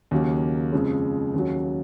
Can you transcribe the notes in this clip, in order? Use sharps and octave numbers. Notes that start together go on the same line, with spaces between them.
D#2 C#3 F#3 A#3
F2 C#3 F3 G#3
D#2 C#3 F#3